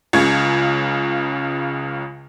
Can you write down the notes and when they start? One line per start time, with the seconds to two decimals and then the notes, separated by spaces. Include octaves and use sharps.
0.13 C#2 C#3 G#6